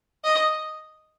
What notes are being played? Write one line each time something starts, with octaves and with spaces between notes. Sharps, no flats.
D#5